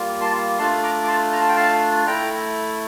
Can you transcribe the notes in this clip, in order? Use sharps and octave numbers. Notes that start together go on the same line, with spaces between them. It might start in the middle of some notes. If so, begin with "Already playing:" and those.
Already playing: G3 A#3 F4
A5 C6
A3 D4 F4 A5 C6
A#5 D6
D6
A5 C6
A#5
A5
G5
F5 A5
A3 E4 G5 A#5